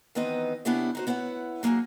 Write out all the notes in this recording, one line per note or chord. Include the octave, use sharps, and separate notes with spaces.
D#3 E3 B3 C4 D#4 D#5
C#3 B3 D4 E4 G4 C#5
D#4 F#4 C5
B3 E4 C#5 E5 F#5
F#3 A#3 D#4 F#4 G#4